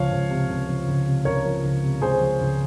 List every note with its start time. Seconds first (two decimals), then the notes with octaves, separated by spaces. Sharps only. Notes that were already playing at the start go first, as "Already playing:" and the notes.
Already playing: C#2 F3 C#5 F5
0.12 C#2
0.30 C3
0.49 C#2
0.68 F3
0.88 C#2
1.06 C3
1.25 C#2 A#4 C#5
1.45 F3
1.64 C#2
1.84 C3
2.02 C#2 G#4 C5
2.21 F3
2.41 C#2